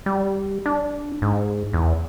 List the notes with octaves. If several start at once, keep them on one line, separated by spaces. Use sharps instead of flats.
G3
D4
G#2
E2